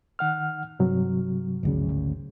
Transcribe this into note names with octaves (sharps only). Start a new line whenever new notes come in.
D#3 F#5 F6
G2 C3 F#3
G#1 D2 C#3